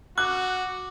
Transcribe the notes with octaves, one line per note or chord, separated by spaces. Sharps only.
F#4 D6 F#6